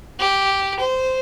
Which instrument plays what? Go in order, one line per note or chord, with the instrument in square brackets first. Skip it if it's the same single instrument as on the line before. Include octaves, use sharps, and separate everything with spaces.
[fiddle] G4
C5